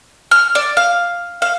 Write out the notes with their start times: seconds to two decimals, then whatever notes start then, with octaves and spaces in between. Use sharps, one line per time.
0.31 F6
0.55 D5
0.77 F5
1.42 F5